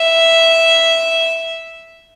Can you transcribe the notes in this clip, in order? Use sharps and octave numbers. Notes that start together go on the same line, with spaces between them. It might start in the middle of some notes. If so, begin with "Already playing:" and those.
Already playing: E5